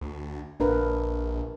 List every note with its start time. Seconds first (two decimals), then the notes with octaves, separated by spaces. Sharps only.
0.01 D2
0.60 A#1 D4 A#4 B4